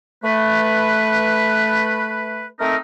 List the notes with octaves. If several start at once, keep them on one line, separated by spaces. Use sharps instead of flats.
A3 B4
A3 C4 D#4 A#4